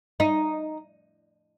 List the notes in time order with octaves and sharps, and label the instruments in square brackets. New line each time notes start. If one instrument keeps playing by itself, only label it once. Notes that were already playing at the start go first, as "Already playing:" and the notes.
[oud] D#4